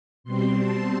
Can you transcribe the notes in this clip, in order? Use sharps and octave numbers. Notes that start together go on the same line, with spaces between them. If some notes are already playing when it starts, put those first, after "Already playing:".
B2 G3 C4 C6
A5